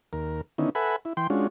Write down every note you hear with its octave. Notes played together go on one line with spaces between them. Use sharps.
D#2 A#4
D3 D#3 B3 C#4 D#4 E4
A4 B4 E5 F#5 G#5 B5
E4
E3 G5 C6
G#3 C#4 D4 F4 F#4